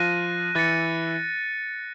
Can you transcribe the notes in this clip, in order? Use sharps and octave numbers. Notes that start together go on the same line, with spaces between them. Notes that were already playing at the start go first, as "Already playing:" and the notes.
Already playing: F3 F4 F#6 A#6 D#7
E3 E4 F#6 A6 C#7